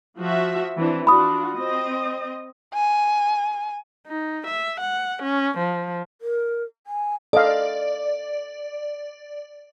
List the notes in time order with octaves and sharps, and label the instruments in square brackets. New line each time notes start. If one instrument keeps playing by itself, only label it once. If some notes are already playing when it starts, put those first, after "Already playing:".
[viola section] F3 F#4 E5
E3 C4 D4
[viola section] D4 F4 F#4 [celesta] B5 D#6
[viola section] C4 D#5
[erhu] G#5
[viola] D#4
E5
F#5
C#4
F3
[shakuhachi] A#4
G#5
[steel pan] A4 D#5 F5 [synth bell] D5